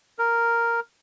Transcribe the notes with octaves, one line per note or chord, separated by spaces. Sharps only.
A#4